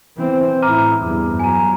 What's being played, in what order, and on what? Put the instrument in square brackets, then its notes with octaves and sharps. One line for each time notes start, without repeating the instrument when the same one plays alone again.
[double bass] E3 C4
[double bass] A2 E4 [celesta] A#5 D6 F6
[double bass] E2 G2
[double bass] F#3 [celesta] G#5 A#5